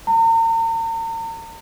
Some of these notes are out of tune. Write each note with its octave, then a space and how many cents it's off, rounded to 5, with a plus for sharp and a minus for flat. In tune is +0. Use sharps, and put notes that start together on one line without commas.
A#5 -40